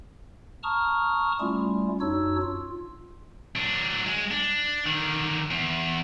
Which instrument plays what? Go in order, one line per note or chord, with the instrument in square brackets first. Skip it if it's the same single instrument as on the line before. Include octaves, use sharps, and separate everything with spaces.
[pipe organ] A5 A#5 C#6 D#6 F6
G3 A3 C#4 E4 F4
F#2 D4 D#4 F#4 C#5 E6
F4
[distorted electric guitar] F#3 D4
G#3
D4
D3 D#3
E2